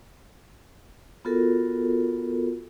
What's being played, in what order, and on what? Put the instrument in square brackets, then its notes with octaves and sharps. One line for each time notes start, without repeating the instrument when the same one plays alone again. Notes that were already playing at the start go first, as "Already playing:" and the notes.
[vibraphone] B3 F4 F#4 A4 A#4